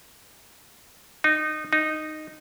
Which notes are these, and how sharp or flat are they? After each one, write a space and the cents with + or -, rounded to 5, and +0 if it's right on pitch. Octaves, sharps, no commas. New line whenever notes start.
D#4 -20
D#4 -10